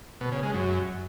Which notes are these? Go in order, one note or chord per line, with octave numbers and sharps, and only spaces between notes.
B2
C#3
G#3
F#2